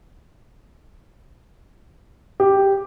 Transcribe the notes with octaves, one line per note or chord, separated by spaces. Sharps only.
G4